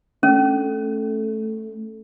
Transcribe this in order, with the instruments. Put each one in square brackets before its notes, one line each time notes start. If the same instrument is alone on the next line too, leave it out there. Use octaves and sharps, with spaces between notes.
[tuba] A3 [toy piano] C#4